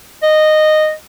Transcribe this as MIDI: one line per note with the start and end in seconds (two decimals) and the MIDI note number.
0.23 0.93 75